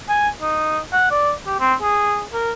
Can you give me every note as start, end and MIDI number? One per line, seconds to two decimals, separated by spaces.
0.09 0.29 80
0.41 0.79 63
0.93 1.09 78
1.11 1.32 74
1.47 1.55 67
1.59 1.74 60
1.82 2.23 68
2.33 2.52 70